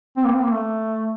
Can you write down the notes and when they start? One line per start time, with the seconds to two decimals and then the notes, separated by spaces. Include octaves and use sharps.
0.17 C4
0.25 A#3
0.35 C4
0.43 A#3
0.52 A3